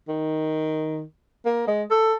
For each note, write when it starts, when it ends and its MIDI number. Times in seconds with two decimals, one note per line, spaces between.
0.08 1.02 51
1.46 1.67 58
1.68 1.83 56
1.91 2.14 69